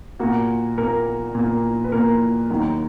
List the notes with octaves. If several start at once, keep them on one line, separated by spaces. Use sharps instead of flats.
A#2 A#3 F#4
A#2 A#3 A#4
A#2 A#3
B4
A#2 A#3 A#4
D#2 D#3 F#3 A#3